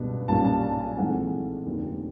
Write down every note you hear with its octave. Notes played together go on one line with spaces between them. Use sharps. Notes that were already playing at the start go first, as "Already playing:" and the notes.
Already playing: C#2 B2 G3 B3 D4
B1 A#2 G3 A#3 C#4 A5
A5
A5
G#5
A#1 G#2 E3 A3 C4 F#5
F1 D#2 D3